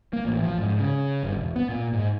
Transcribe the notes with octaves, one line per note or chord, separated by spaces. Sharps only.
A#3
A1
F3
G#2
C#3
G1
E1
B3
A#2
G#2